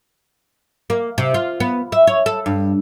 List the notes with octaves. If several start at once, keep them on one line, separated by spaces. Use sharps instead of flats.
A#3
C3
F4
B3
E5
C#5
A4
G2